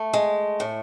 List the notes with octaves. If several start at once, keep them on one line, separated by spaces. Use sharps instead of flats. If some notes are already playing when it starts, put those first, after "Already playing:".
Already playing: A3
G#3
A2